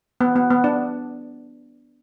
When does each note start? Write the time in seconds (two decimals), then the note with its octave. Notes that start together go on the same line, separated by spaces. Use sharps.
0.21 B3
0.36 B3
0.50 B3
0.64 D4